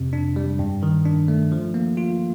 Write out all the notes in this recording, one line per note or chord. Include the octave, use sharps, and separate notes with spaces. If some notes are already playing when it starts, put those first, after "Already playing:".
Already playing: F2 C3
D4
G3
G2
D#3
D4
A3
F3
A#3
F4